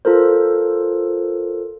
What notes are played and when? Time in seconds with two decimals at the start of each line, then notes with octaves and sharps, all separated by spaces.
0.05 F4 A4 A#4 C5